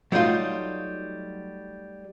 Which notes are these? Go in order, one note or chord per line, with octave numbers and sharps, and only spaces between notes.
F#3 G3 A3 D#4 F4